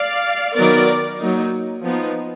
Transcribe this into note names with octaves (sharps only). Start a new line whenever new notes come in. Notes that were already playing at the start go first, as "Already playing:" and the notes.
Already playing: D5 F5
D#3 F#3 B3 A#4 D5
F#3 A#3 D#4
F3 B3 D#4